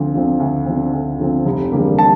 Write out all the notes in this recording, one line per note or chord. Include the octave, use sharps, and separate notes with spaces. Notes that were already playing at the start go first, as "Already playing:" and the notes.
Already playing: D2 D3 F3 C4
D3 F3 C4
D2
D3 F3 C4
D2
D3 F3 C4
F1
E2 D3 G3 A#3
A5